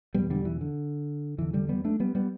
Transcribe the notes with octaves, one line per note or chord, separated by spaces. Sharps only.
E2 B2 G3 B3
D3 G3
E3
D3
E2 D3 E3
D3 G3
G3 B3
A3 D4
G3 B3
G3 B3